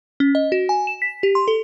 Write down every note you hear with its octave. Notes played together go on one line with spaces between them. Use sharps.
C#4
D#5
F#4
G#5
E7
B6
G4
C6
A4